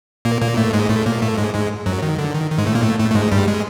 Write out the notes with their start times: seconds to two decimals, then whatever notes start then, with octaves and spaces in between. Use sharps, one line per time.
0.25 A#2 A#3
0.42 A#2 A#3
0.57 A2 A3
0.73 G#2 G#3
0.89 A2 A3
1.06 A#2 A#3
1.22 A2 A3
1.37 G#2 G#3
1.54 G#2 G#3
1.86 F#2 F#3
2.02 D#3
2.18 D3
2.34 D#3
2.51 D#3
2.58 G#2 G#3
2.67 A2 A3
2.75 A#2 A#3
2.82 A2 A3
2.99 A2 A3
3.11 A3
3.15 G#2 G#3
3.31 G2 G3
3.48 G#3